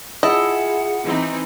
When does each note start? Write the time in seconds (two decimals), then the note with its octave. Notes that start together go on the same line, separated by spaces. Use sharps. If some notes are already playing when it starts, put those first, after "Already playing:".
0.23 E4 F4 G#4 D#5 F#5 A5
1.05 E3 C4 D#4